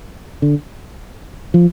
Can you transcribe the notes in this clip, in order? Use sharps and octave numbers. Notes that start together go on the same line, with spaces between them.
D3
F3